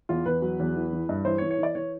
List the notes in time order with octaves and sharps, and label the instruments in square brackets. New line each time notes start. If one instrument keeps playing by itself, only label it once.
[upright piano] E2 F4
E2 B4
F#3
E2
E3
E3
G2
E3 C5
C#5
E3
C#5
E3 D5
E3 C#5